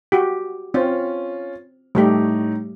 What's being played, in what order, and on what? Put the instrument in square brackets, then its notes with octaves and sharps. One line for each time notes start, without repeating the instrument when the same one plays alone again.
[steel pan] F#4 G4
[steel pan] C4 [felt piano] C#4 F4
[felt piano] A2 D#4 [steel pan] G3 A3 G4